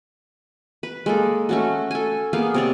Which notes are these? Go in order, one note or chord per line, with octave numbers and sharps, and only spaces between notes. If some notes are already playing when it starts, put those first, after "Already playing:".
B4
G#3 A#3 A4
A3 C#4 F#4
A4 G#5
A#3 B3 G#4 F5
C3 C#5 D5